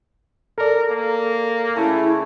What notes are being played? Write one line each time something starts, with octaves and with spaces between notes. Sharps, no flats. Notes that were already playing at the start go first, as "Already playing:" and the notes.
A4 A#4 D5
A#3
C#3 A3 E4 A4